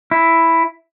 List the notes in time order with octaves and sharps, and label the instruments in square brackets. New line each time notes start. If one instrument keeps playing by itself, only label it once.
[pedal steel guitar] E4